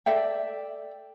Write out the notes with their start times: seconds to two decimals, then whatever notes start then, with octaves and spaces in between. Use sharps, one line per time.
0.06 A4 D5 E5 G5